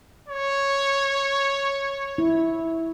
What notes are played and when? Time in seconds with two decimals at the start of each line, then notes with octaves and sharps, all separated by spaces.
0.28 C#5
2.18 E4